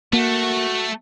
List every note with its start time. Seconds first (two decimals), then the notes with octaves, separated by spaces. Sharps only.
0.13 A3 A#3 F#4